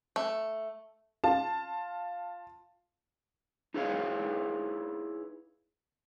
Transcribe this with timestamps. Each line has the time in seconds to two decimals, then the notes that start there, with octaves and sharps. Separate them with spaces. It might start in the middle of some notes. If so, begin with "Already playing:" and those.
0.16 A3
1.24 F4 A5
3.74 D#4 E4 G#4 B4 C#5 F5